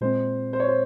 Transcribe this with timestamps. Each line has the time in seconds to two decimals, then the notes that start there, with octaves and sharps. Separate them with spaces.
0.01 A#2 G#3 C4 C5
0.53 C5
0.60 C#5
0.68 C5